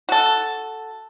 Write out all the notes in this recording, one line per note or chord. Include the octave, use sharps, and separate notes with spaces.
F#4 A4